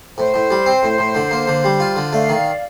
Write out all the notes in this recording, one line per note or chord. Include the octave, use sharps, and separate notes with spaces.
A2 C5
A2
G3
C4
A2
A2
D3
A#3
D3
G3
F4
D3
A3 D5 F5
D#3